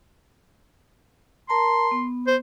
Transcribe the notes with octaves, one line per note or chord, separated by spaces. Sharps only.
A#4 A5 A#5 C6
B3
C5